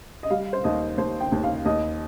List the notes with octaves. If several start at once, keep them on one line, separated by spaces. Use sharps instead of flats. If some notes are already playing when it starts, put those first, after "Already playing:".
D#5
G3 F5
C5
D#2 D#5
D#2 C5
G5
D#2
F5
D#2 D#5